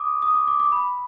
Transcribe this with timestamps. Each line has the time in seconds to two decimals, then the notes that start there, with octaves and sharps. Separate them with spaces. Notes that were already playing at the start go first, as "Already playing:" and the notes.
Already playing: D6 D#6
0.22 D#6
0.34 D6
0.47 D6
0.60 D6
0.72 B5